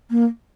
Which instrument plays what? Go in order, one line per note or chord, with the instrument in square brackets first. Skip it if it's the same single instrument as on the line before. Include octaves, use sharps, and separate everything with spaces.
[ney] A#3